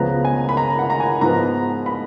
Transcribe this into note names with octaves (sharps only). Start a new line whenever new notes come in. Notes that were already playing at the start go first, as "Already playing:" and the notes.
Already playing: C#2 C#3 F3 B3 A#5
G#5
B5
A#5
F#5
A#5
G#5
G#2 F3 B3 A#5
B5